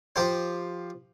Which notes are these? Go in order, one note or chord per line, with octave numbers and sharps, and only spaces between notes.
F3 G4 C5